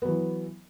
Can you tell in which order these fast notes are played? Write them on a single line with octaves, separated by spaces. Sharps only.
B3 F#3 E3